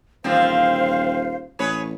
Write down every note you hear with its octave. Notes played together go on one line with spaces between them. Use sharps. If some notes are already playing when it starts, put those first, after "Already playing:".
D#1 E3 F3 C4 C5 F5
A1 G#4 B4 C#5